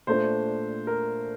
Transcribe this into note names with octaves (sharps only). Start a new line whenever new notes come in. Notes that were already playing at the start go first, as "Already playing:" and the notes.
A#2 A3 D4 C5
A#4